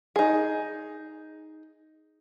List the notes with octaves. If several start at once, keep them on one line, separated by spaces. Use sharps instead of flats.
D#4 G#4